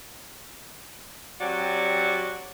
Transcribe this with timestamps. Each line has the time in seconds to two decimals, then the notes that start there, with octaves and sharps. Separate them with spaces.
1.40 F#3 C4 F#4 G4 D5